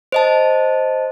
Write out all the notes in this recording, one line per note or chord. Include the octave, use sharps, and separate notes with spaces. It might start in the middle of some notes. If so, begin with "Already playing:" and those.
C5 D#5 A5